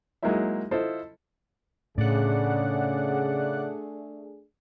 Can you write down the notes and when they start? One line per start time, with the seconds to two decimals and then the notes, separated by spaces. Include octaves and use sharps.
0.23 F#3 G#3 A#3 D#4 E4 E5
0.71 E4 F4 A4 C5 D#5
1.98 A2 C#3 A3 D4 G#4 D5 F#5